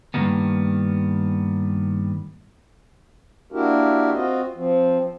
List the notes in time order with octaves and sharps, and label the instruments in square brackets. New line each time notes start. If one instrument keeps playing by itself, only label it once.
[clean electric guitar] G2 D3 D#3 G3 A#3 B3
[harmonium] A#3 D4 E4 F#4 G4 A#4
C4 F4 F#4 D#5
F3 C4